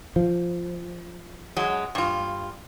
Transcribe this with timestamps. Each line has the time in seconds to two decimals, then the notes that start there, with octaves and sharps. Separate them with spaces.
0.16 F3
1.56 F#2 F#3 G#3
1.95 G2 F4